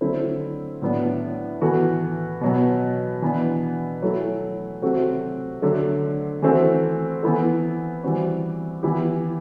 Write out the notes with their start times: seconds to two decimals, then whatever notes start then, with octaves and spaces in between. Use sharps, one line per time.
0.01 D3 F#3 A3 C4 E4
0.82 A2 F#3 B3 D4
1.61 E3 B3 F#4 A4
2.41 B2 F#3 B3
3.22 E3 B3 D4
4.02 F#3 A3 E4
4.82 C3 F#3 A3 C4 F#4
5.62 D3 F#3 A3
6.42 E3 A3 C4 F#4
7.23 E3 B3 E4 A4
8.03 E3 G3 C4 F#4
8.83 E3 B3 E4 G4